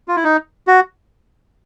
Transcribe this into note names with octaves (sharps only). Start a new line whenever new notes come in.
F4
E4
D#4
F#4